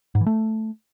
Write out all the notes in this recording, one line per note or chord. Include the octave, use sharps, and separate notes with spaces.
G#2
E3
A3